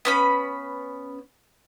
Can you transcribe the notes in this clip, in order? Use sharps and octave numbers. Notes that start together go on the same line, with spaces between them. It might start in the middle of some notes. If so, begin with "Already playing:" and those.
B3 C#4 B5